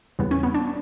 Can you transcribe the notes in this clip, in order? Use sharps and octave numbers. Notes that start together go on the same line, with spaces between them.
E2 C#3 G3 B3
C#4
B3
D4